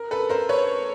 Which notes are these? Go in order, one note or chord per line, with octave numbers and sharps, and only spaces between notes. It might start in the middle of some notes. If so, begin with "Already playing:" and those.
Already playing: A#4
A4 B4
A#4 C5
B4 C#5